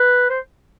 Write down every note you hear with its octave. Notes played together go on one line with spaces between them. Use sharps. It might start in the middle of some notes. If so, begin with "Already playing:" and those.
Already playing: B4
C5